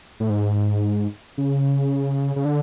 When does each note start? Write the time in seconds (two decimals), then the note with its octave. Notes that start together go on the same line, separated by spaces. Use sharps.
0.20 A2
0.30 G#2
1.38 C#3
2.36 C#3
2.45 D3